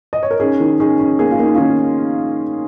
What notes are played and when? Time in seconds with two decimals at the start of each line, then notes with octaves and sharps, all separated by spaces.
0.13 D#5
0.23 C#5
0.31 A#4
0.40 C#4 D#4 G#4
0.60 D#3
0.80 C#4 D#4 G#4
0.99 C#4
1.19 A#3 G#4
1.31 F4
1.39 A#3 D#4
1.54 D#3 C#4 F4